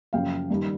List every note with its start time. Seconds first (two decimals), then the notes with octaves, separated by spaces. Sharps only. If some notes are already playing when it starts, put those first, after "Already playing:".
0.13 F#2 C#3 F3 F5 G5
0.50 G2 D#3 G3